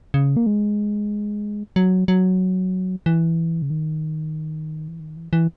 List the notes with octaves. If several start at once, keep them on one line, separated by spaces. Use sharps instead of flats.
C#3
A#3
G#3
F#3
F#3
E3
C#3
D#3
E3
D#3
E3
E3